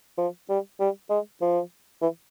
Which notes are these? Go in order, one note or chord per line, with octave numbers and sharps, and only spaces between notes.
F3
G3
G3
G#3
F3
E3